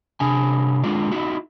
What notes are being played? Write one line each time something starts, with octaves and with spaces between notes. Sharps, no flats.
C3 D4 G#5
G#3 D4 F4 D5
D#4 E4 F#4